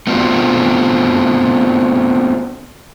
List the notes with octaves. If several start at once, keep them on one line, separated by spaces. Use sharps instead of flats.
A3 B3 C4 D4 F4 F#4